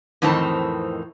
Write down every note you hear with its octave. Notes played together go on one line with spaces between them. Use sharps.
F2 A2 D#3 E3 C4 A5